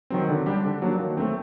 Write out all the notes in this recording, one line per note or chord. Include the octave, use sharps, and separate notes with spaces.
D#3 F#3 C4
D3
G3 D4 G4
D3
F#3 A#3 D4
D#3
A3 C4